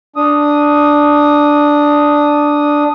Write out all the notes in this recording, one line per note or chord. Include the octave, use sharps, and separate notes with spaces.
D4 D#6